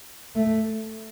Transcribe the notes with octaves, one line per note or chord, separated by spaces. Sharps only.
A3